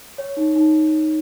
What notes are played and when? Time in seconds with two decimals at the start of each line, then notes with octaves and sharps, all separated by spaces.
0.18 C#5
0.37 D#4
0.56 D#4